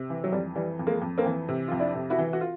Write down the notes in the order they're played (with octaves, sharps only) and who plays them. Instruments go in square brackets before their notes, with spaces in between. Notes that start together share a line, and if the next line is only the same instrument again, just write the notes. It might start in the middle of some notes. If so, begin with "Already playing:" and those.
Already playing: [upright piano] C3
E3
F#3
F2 G3
E3 G3
F2
G#3 A#3
F2
A#3 C4
E3
C3
F2 F4
D4 E4
C3
E4 F#4
E3
F#4
F4